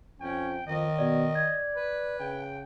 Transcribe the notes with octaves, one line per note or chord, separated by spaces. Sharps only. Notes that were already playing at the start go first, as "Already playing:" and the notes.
F2 C#4 G5
F2 D#3 D#5
B2 D5
D5 G#6
B4
C#3 G5